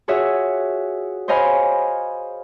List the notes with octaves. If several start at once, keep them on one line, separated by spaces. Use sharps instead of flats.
F4 F#4 G#4 C#5 E5
C5 C#5 D#5 F5 G#5 B5